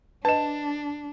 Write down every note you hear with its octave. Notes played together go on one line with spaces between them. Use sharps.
D4 B4 D#5 A5 E7